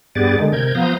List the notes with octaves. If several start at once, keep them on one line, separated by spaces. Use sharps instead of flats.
G2 B3 G4 G#4 D5 A6
D3 D#3 G#3
C3 A#4 G6 G#6
F3 B3 F5 A#5 D#6 G6